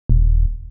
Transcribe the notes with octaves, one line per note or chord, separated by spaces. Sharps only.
D#1